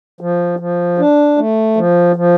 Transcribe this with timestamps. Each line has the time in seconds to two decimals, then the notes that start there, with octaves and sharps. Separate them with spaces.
0.21 F3
0.59 F3
0.98 D4
1.38 A3
1.77 F3
2.16 F3